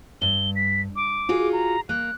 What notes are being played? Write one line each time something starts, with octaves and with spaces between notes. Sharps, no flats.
G2 G7
B6
D6
F4 F#4 G#4
A#5
A#3 F#6